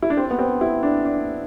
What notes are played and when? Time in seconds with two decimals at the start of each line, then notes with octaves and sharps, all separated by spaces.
0.02 E4
0.10 D4
0.17 C4
0.31 B3
0.39 C4
0.61 E4
0.83 D4
1.05 D4